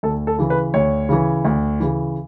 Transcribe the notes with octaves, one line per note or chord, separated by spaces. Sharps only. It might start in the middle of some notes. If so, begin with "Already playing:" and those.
D2 A4
A4
C#3 E3
B4
D2 C#5
C#3 E3
D2
C#3 E3